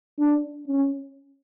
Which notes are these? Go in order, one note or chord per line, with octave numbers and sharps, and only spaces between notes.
D4
C#4